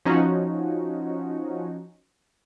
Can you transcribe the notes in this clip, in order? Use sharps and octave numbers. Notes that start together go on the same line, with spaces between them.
F3 C#4 D#4 F#4